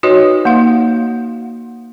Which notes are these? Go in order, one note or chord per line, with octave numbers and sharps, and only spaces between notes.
D#4 F#4 B4 C#5 D#5
A#3 D#4 F5